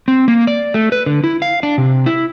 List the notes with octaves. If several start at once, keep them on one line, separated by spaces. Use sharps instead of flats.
C4
A#3
D5
A3
B4
D3
E4
F5
D4
C3
E4